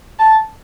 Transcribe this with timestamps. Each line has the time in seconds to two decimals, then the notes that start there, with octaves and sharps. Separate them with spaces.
0.19 A5